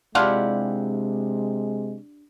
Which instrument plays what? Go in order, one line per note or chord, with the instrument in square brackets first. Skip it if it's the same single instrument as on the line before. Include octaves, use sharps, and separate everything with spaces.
[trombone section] C3 G#3 [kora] D4 E4 G4 [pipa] F4 F5 F#5